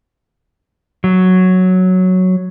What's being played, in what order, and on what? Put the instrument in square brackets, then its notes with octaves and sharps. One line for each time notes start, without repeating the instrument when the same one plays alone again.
[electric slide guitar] F#3